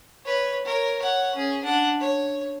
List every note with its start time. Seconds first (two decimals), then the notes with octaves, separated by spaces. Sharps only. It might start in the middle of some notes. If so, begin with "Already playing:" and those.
0.25 B4 C#5
0.65 A#4 C#5
0.99 C#5 F#5
1.35 C#4 G#4
1.63 D4 F#5
2.00 C#5